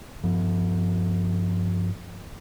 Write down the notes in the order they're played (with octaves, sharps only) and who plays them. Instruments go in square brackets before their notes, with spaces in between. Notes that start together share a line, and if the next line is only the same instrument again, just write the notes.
[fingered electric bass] G2 F3